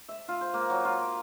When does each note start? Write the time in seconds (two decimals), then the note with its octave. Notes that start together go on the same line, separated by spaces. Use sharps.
0.09 E5
0.28 F4
0.41 C5
0.54 A#3
0.70 F#3
0.85 F4
1.01 D6